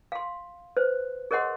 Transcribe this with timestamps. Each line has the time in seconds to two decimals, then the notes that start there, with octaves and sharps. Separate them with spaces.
0.12 F5 C6
0.77 B4 C5
1.31 G#4 A#4 C#5 D#5 F#5 C6